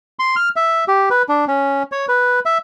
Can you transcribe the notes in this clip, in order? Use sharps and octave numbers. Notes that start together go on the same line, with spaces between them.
C6
F6
E5
G4
B4
D4
C#4
C#5
B4
E5